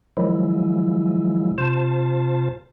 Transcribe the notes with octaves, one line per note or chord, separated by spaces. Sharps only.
D#3 F3 F#3 G#3 E4
C3 F4 C5 A5